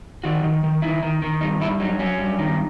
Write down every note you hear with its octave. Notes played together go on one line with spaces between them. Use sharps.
D#3 F#4
D#3
D#3
D#3 E4
D#3
D#3
G2 D#4
G2 E4
F#3 D#4
F#3 C#4
G2
D#3